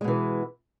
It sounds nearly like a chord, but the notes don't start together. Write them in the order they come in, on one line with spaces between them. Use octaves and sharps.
G#3 B2 E3